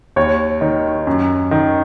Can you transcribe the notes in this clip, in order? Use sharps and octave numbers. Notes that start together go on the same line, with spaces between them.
D#2 C#5
D#3
F#2
D#3